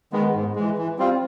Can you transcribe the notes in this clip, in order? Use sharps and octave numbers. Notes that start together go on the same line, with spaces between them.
D#3 G#3 B3
G#2
E3 G#3
E3
G3 C4 F4